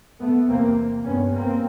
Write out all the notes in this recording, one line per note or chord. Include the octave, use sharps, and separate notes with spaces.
A3 B3
E2 C3 A#3 C4
G2 B3 C#4
A#3 C4